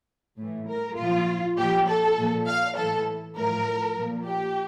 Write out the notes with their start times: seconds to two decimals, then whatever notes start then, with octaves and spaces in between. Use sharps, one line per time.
0.38 A2
0.43 E3
0.68 A#4
0.98 A#2 F3 F4
1.58 A#2 F3 G4
1.88 A4
2.18 A#2 F3
2.47 F5
2.77 A2 E3 A4
3.37 A2 F3 A#4
3.97 A#2 F3
4.27 G4